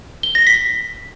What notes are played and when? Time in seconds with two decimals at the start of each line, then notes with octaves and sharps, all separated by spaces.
0.23 G7
0.35 A#6
0.47 B6